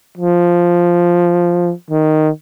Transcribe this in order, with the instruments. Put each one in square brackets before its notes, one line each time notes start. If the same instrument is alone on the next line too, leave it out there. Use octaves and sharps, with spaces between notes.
[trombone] F3
D#3